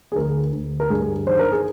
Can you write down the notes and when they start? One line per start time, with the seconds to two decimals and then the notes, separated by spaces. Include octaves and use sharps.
0.12 G#4
0.16 D2 A#4
0.53 D2
0.80 A#4
0.90 G2 G#4
1.27 D#3 C5
1.39 A#4
1.52 G#4